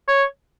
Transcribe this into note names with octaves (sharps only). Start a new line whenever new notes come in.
C#5